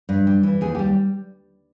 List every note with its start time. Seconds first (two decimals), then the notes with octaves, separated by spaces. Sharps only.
0.09 G2
0.27 G3
0.43 E3
0.61 D#2 G#4
0.75 G3 G4